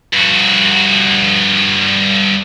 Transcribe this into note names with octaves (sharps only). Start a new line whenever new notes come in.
G2 F#4